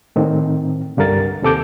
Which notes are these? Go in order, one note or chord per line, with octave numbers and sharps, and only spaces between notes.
A2 D#3 C4
C2 G2 D3 A#4 A6
D#2 C3 A4 D6 G6